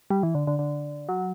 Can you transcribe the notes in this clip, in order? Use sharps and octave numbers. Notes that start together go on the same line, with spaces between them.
G3
E3
D3
D3
D3
F#3